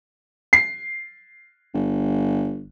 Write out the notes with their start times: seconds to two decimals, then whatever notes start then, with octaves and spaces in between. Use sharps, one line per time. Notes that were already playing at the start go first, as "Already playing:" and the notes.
0.53 C7
1.74 G1